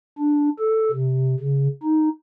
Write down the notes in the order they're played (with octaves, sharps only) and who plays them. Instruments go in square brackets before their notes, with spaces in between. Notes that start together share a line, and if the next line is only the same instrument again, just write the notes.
[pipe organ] D4
A4
C3
C#3
D#4